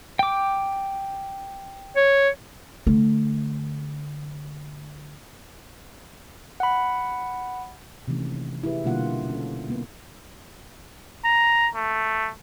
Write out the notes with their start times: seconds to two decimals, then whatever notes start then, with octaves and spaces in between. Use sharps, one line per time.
0.19 G5 D6
1.96 C#5
2.86 D3 A3
6.60 F#5 B5
8.08 C3 D#3 E3 A3 A#3 C#4
8.63 E4 G4 G#4 B4
8.84 B2 D3 G3 A#3 F4 F#5
9.29 C#4 A4
9.69 A#3 B3 B4
11.25 A#5
11.75 A3